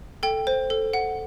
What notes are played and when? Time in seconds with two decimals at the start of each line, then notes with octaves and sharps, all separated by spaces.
0.23 A4 G5
0.47 C5
0.70 A4
0.93 F#5